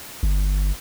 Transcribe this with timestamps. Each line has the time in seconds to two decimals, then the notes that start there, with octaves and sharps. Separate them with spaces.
0.23 G1